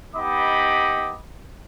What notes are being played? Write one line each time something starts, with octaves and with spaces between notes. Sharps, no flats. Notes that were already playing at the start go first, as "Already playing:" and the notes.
B3 D#4 G4 D#5 B5 D6